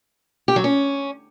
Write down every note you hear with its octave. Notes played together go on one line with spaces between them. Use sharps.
G4
F#3
C#4